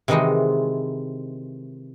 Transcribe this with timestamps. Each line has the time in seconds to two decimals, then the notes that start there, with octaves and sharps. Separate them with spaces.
0.08 C3 D#3 E3 G#3 D#4 F#4